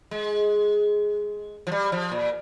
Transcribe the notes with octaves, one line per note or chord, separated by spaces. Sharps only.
G#3
F3
G3
F3
A#2